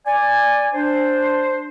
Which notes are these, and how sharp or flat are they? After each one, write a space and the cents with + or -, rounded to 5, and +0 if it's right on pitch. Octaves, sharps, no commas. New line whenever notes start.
D5 +0 G#5 -15
D4 +0 C5 +0